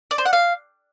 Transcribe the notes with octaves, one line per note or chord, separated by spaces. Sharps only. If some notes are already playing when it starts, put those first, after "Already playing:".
D5
C5
F#5
F5